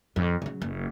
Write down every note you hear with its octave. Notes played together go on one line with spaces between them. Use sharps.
F2
C#3 F#3
F#1